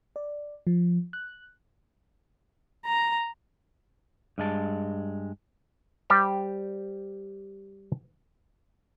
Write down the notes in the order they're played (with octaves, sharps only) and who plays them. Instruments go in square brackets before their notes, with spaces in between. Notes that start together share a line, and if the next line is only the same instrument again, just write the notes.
[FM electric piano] D5
F3
F#6
[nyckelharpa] A#5
[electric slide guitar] G2 G#3 A5
[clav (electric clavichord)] G3 G4 C5